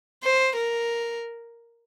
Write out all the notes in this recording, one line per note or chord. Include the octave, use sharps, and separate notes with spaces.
C5
A#4